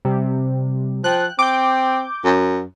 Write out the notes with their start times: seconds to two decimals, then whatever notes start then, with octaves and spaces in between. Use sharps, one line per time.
0.05 C3 G3
1.04 F3 G5 F#6
1.39 C4 D6 G6
2.24 F#2